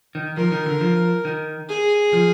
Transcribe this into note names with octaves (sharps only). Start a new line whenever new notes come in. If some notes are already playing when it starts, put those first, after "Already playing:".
D#3
F3 A#4
D#3
D3
F3
D#3
G#4
F3